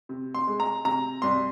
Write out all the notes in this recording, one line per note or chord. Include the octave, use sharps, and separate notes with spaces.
C3
C6
G#3
A#5
C3 A#5
C2 C6